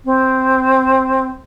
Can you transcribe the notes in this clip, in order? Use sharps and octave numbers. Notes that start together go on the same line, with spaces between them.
C4